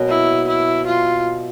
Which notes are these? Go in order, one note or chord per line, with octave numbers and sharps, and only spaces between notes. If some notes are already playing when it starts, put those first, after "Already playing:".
Already playing: B2 F#3 A#3 C#4
E4
E4
F4